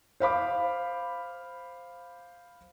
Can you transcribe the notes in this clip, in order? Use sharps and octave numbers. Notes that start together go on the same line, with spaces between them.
C5 F5 B5 D6